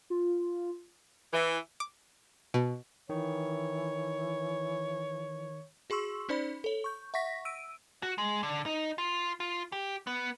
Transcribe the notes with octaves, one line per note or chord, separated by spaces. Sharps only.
F4
E3
D6
B2
D#3 E3 C#5
F#4 G#4 C6 C#6 E6
C#4 D#4 C5 D5 B5
A4 C#5
C#6 G6
E5 F#5 C#6 A#6 B6
E6 D7 D#7
F#4
G#3
D3
D#4
F4
F4
G4
B3